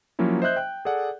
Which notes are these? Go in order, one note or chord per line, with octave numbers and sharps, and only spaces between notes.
F3 F#3 A#3 C#4 E4
C5 D#5 E5 F#6 G6
G5 F#6
G#4 A4 D5 F#5